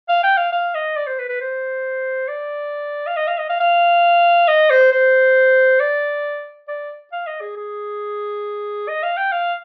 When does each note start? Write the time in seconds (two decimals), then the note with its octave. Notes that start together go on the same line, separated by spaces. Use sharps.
0.09 F5
0.23 G5
0.37 F5
0.52 F5
0.75 D#5
0.97 D5
1.07 C5
1.19 B4
1.29 B4
1.41 C5
2.28 D5
3.07 F5
3.16 D#5
3.27 F5
3.38 D#5
3.49 F5
3.60 F5
4.48 D#5
4.70 C5
4.92 C5
5.80 D5
6.68 D5
7.12 F5
7.27 D#5
7.41 G#4
7.56 G#4
8.88 D#5
9.03 F5
9.17 G5
9.32 F5